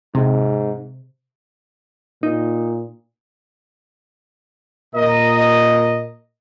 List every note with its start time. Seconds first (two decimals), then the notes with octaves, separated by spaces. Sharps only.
0.15 G#2 C3
2.23 A#2 D#4
4.95 A#2 A#4 D#5